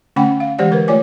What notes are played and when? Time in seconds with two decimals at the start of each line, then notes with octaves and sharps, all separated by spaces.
0.16 D3 A3 C#4 F#5 G5 B5
0.40 F5
0.59 E3 G#3 G4 C5 D5 F#5
0.71 D3 A#4 B4
0.88 A3 F4 C#5 D5 G#5 D6